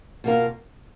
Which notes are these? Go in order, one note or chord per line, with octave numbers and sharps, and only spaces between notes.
B2 A#3 F4 A#4 F5